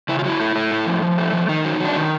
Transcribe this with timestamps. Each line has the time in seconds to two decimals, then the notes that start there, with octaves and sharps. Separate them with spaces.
0.08 C#3 E4
0.19 F4
0.24 F#3 E4
0.40 A3
0.55 A3
0.72 A2
0.87 F3
1.02 F3
1.18 A3
1.33 F3
1.49 D#3 D#4
1.64 F#3
1.80 F#3
1.85 D4
1.96 D#3 D#4